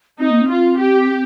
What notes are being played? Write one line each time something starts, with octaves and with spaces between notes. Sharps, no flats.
C4 D#4
A#3
C4
F4
G4